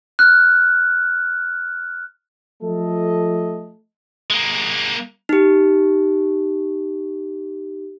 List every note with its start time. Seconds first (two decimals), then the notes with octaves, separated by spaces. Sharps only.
0.19 F6 F#6
2.62 F3 A3 A4 D#5
4.30 G#3 A#3
5.29 D#4 G4